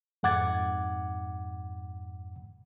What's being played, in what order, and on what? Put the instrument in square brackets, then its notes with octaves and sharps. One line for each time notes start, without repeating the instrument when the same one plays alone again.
[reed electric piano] F2 G#2 F#5 D6 G#6 A6